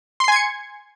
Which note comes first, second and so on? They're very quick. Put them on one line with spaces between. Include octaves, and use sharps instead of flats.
C6 C7 G#5 G#6 C#7